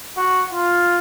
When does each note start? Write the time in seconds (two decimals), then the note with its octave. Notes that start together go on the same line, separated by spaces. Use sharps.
0.17 F#4
0.52 F4